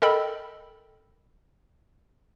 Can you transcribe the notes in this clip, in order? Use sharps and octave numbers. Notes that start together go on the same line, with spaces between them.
A4 A#4 D#5 G5 B5 E6